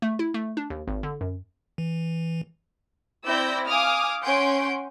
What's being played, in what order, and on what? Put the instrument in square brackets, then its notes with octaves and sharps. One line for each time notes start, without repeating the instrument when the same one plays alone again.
[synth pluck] A3
E4
A3
D4
D#2
G#1
D3
F#2
[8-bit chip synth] E3
[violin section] C4 E4 D5 E6 G6 A#6
F5 G#5 D6 D#6 F6
C#4 F#5 G#5 C6 G6 D7